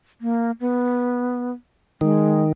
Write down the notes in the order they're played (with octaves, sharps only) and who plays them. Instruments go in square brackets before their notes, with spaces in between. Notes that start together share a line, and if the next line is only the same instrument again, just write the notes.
[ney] A#3
B3
[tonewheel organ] D#3 [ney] G#3